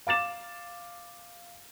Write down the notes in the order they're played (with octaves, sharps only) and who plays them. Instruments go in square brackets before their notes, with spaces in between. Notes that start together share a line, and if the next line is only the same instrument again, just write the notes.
[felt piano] F5 D6 A6 E7